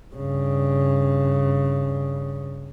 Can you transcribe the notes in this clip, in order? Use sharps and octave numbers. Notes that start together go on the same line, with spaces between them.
G2 C#3